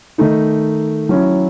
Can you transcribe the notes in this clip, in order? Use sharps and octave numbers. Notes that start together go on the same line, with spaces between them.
D#3 A3 D#4
F#3 C#4 E4